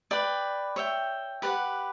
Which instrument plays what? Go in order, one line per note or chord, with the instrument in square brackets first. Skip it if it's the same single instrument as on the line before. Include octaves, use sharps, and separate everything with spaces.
[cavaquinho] B4 D5 G5
C#5 E5 G5
G4 B4 D5 F#5